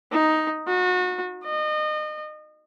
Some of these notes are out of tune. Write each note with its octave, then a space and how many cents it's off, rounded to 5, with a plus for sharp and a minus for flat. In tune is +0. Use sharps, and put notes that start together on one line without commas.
D#4 +5
F#4 -30
D#5 -30